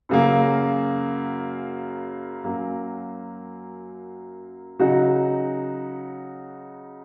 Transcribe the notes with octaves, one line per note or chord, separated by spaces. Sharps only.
F#2 C#3 F#3 A#3
F#2 F#3 A#3
C#3 F#3 D#4 F#4